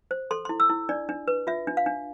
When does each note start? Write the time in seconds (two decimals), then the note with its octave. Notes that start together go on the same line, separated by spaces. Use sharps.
0.11 C5
0.31 A4 C6
0.45 C6
0.49 E4
0.60 E6
0.70 E4
0.89 D4 D5
1.09 D4
1.28 B4
1.47 F4 E5
1.67 D4
1.77 F5
1.86 D4